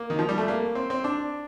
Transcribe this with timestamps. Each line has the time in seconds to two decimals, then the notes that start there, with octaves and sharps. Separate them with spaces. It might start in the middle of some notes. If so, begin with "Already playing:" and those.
Already playing: A#3
0.10 D#3
0.19 F3
0.29 G3
0.38 A3
0.48 A#3
0.75 C4
0.90 C4
1.04 D4